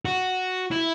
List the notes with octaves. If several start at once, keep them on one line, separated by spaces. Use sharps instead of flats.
F#4
E4